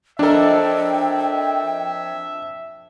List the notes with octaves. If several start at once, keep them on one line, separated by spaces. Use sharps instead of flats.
F2 D4 A4 A#4 E5 G5